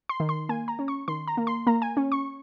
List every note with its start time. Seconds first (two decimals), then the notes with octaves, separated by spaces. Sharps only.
0.09 C6
0.20 D#3
0.29 C6
0.49 A#3 G#5
0.68 A#5
0.79 C#4
0.88 C#6
1.08 D#3 C6
1.28 A#5
1.37 A#3
1.47 C6
1.67 A#3 A#5
1.82 G#5
1.97 C#4
2.12 C#6